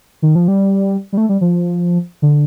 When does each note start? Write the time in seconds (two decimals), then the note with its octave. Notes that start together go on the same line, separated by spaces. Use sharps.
0.22 D#3
0.35 F3
0.48 G3
1.13 G3
1.17 A3
1.29 G3
1.41 F3
2.22 D3